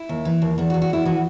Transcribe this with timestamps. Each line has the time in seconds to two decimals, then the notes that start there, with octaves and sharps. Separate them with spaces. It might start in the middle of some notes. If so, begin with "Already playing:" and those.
Already playing: E4
0.09 D#2
0.25 E3
0.42 D#2
0.58 E2 E4
0.70 F#4
0.74 E2
0.82 F#4
0.90 E2 E4
1.05 E3 F#4